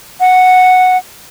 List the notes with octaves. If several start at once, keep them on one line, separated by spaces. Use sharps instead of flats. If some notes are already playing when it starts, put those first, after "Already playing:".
F#5